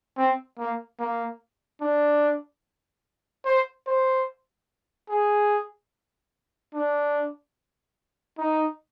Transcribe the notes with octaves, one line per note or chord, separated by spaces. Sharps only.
C4
A#3
A#3
D4
C5
C5
G#4
D4
D#4